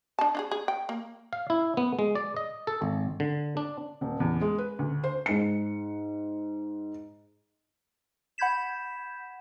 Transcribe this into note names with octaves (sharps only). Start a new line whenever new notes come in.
D4 A5
D4 F4 G#4
G#4
G5
A#3
F5
E4
B3
G#3
D5
D#5
A4
G#1
D3
D4
D#1
E2
G#3
B4
D2
C5
G#2 C#7
F#5 B5 G6 G#6 B6 E7